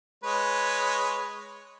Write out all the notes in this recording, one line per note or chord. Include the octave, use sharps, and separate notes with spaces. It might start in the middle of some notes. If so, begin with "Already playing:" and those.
G#3 B4 C#5